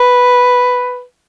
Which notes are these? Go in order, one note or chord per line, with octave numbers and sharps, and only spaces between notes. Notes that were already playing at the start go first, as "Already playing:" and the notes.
Already playing: B4